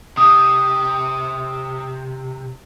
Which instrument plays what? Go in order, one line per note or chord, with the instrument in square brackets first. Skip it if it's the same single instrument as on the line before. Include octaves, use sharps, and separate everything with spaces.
[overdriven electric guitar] C3 [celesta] D#6